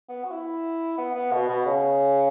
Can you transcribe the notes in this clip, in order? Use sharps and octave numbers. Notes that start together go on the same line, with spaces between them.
B3
F#4
E4
B3
B3
B2
B2
C#3